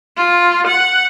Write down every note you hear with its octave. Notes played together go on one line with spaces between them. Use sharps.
F4
F#5